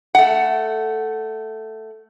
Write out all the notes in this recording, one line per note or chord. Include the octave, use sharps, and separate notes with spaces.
A3 F#5